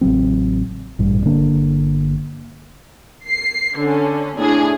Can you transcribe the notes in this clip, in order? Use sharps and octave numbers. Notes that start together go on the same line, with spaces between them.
A1 C#3 F#3 C4
A1 G2 A#2
G1 D3 A#3 D4
C7
D3 C#4
A2 D4 G#4